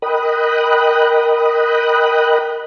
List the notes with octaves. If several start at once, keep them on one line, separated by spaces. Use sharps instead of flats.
A#4 D#5 G5 B5 D#6 F#6